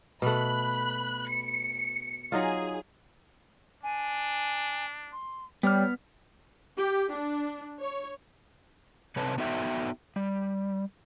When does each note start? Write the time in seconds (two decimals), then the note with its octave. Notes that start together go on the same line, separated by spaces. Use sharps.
0.22 B2 A3 B5 F#6
1.30 C#7
2.32 F#3 D#4 F4 G#4
3.83 D4 G#5
5.12 C6
5.63 G3 B3 C#5 F6
6.77 G4
7.12 D4
7.80 C#5
9.16 C3 C4 A4 B4 C#5 A5
9.38 B3 D#4 F#4 A4 E5 G5
10.16 G3